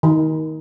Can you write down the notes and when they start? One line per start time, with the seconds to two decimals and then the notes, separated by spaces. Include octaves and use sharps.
0.03 D#3